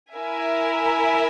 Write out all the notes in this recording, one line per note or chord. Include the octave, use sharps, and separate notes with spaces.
E4 A#4 E5 G#5